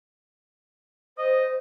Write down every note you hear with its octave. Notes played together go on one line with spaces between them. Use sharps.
C5 D#5